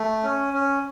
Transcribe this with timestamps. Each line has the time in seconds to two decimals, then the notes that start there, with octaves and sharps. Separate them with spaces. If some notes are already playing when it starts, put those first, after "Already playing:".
Already playing: A3
0.23 C#4
0.53 C#4